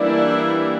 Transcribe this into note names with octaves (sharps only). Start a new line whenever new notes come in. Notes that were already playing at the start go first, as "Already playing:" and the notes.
Already playing: E3 G3 A#3 D4 E4